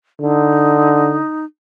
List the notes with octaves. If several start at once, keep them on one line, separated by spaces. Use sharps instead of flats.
D3 D#4